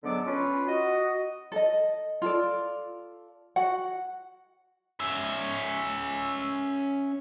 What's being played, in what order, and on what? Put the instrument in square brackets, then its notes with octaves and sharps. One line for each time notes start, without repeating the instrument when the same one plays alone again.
[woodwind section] G#2 D3 F#3 B3 A4 D6
C#4 F4 B4
F#4 D#5
[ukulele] A4 D#5
F4 A4 D5
F#4 F#5
[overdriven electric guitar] C#4 E5